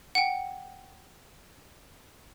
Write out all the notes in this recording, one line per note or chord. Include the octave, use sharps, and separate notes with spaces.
F#5 G5